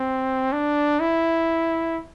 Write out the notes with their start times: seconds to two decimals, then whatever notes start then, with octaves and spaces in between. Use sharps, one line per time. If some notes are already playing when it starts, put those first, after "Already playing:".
Already playing: C4
0.53 D4
1.00 E4